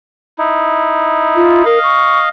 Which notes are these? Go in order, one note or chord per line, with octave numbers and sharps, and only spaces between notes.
D#4 E4
F4
A#4 D#5 F5
C#6